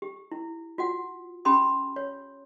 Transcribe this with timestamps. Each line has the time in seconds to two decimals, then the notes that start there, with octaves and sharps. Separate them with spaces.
0.02 G4
0.32 E4
0.78 F4 F#4 F#5
1.45 C#4 G4 G#5 B5 C6 D#6
1.96 C#5